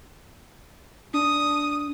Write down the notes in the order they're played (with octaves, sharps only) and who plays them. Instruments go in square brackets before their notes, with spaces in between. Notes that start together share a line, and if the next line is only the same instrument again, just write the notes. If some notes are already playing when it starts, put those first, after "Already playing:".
[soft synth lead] D4 [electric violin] D#6